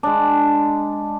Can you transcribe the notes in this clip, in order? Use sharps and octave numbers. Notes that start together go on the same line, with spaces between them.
G#3 D4